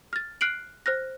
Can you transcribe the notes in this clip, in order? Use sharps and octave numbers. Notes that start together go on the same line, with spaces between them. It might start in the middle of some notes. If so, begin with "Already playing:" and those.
F6 A6
F6 F#6 C7 D7 F#7
C5 F6 F#6 A#6